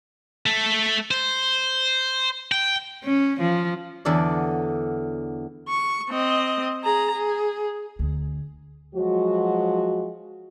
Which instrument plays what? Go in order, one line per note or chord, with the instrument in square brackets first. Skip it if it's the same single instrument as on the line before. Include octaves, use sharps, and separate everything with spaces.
[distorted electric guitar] A3
C5
G5
[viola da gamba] C#4
F3
[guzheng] E2 D3 F#3 A4 D5
[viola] C#6
C4 D#5
G#4 A#5
G#4
[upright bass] D2
[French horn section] F3 F#3 G#3 F#4